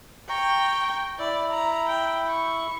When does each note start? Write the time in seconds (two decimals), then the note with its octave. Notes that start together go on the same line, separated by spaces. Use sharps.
0.29 G5 A#5 C#6
1.19 E4 D5
1.51 A#5
1.88 G5
2.30 C#6